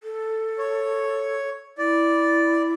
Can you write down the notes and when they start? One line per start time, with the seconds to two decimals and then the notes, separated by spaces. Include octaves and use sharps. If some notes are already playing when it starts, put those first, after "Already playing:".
0.03 A4
0.58 C#5
1.78 E4 D5